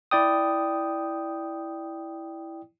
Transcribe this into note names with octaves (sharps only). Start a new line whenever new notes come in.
E4 D5 G5 D#6